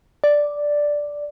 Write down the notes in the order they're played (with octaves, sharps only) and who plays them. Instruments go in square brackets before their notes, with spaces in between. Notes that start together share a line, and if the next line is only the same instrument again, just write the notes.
[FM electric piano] D5